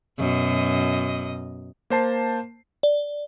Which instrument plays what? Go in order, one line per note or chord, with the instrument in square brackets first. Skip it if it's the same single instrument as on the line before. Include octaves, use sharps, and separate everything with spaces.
[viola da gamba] F#2 B2 D#5
[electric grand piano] A#3 C5 A5 C7
[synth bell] D5